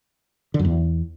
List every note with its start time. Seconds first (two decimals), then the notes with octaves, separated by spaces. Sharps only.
0.54 D3
0.59 F#2
0.65 E2